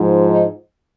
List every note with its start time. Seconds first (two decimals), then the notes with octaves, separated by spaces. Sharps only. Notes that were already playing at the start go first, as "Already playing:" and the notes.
Already playing: G#2 F3
0.28 D#4